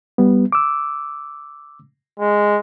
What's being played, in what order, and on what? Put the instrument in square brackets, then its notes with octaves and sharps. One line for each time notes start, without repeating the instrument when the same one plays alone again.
[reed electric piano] G3 B3
D6 E6
[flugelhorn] G#3